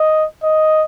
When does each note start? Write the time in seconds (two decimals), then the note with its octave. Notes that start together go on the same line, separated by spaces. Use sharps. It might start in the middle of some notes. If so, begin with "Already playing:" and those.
Already playing: D#5
0.43 D#5